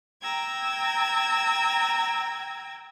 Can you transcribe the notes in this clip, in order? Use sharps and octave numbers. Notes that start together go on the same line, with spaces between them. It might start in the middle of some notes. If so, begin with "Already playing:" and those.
G5 A#5 E6 G#6